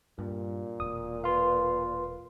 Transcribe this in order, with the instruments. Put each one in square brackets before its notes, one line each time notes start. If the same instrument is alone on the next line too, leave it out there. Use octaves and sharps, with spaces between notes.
[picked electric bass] G2 [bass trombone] A#2
[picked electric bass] E1 [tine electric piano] D#6
[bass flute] B4 [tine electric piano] F5 C6